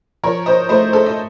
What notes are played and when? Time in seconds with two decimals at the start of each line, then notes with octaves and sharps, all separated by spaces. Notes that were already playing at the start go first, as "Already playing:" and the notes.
0.23 F3 A#4 C#5
0.46 C5 D#5
0.69 A3 C5 D#5
0.93 A4 C5
1.06 D#5